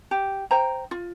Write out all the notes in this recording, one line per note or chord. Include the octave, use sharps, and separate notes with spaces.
G4
C5 G5 A#5
F4